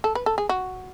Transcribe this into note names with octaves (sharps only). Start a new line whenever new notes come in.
A4
B4
A4
G#4
F#4